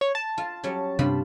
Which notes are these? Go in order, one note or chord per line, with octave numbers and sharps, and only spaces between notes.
C#5
A5
F4
F#3 G3 C#4
G2 C3 C4 F4 B5